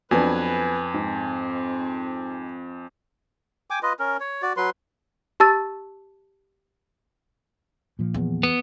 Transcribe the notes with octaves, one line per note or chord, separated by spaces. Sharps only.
F2 F#3 B3 D4 B4 G#5
G#2 C4
G5 G#5 D6
F4 B4 D#5
C#4 A#4
C#5
F#4 D5
F#3 B4 C6
G4 A5 E6 A6
A#2 F3
E2
B3